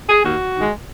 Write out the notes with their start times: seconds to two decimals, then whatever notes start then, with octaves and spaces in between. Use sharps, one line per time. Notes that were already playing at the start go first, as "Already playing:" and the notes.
0.09 G#4
0.25 D#2 F#4
0.57 D#3 G#3